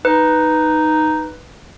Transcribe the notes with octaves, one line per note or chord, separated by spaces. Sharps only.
D#4 B4